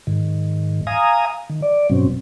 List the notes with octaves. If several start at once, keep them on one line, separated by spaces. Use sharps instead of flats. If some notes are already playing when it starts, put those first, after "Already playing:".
G#2 D#3
F5 G#5 A#5 D#6
D#3
D5
G2 B2 F#3 C4 C#4